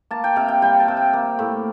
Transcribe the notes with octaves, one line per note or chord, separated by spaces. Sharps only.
A#3 A5
G5
C3 F5
G5
G3 G5
A5
C3
G5
A#3
A2